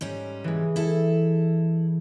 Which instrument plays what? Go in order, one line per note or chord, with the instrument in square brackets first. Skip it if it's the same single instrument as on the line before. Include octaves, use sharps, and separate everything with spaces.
[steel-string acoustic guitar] G#2 G3 C#4
[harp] E3 G#3
[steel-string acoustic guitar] E4 A4